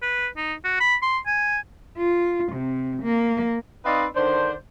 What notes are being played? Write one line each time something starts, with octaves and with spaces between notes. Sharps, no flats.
B4
D#4
F#4
B5
C6
G#5
F4
C3
A#3
C4 D#4 B4 D5 D#5 F5
D3 D#3 D4 C5